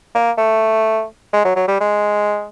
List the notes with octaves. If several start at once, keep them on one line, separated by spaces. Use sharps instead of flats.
A#3
A3
G#3
F#3
F#3
G3
G#3